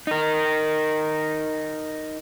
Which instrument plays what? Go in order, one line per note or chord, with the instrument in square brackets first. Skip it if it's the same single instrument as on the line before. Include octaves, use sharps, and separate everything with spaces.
[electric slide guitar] D#4 A#4